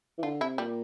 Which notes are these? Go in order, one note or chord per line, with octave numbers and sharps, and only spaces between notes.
E3
D3 F4
C3 E4
A#2 G3